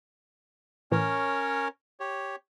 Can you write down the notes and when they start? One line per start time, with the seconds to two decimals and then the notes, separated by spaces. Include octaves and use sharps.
0.92 A2 E3 C#4 A#4 C#5
2.00 G4 C#5